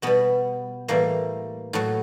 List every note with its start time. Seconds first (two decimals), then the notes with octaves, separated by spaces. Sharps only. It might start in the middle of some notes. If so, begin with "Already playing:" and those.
0.02 B2 G3 B3
0.88 A2 E3 G3 A#3
1.73 A2 F#3